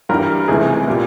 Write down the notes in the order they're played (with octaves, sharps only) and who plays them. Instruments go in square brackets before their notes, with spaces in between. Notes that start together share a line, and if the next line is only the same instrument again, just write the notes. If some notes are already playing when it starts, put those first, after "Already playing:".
[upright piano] G2 E3 G3 A#4
C#2 C3 E3 A3 G#4
A#2 G3